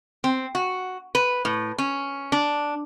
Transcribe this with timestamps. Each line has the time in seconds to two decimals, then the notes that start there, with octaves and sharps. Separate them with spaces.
0.24 C4
0.55 F#4
1.15 B4
1.45 A2
1.78 C#4
2.32 D4